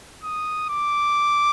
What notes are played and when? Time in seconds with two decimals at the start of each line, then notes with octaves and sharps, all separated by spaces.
0.24 D#6
0.70 D6